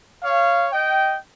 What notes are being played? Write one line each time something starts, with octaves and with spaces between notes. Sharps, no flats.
C#5 F5
D#5 G5